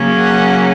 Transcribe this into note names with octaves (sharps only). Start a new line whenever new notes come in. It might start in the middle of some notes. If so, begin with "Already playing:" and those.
Already playing: C#3 F#3 A#3 C#4
F#5